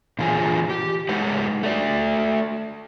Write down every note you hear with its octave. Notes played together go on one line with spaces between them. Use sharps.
A#2 D3 E3 F4 G#4 G#5
G4
G#3 D#4 G4 B4 F#5
A3 D5